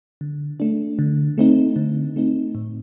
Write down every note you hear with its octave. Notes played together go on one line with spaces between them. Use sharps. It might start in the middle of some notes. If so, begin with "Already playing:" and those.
D3
A3 D4
D3
A3 C4 D#4
D3
A3 C4 D#4
A2